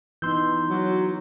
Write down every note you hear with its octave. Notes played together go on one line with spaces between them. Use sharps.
E3 B3 D#4 C6 E6 G6
F#3